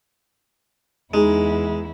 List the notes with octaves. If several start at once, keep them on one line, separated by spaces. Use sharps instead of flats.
E2 G#3 D#4 E4 G#4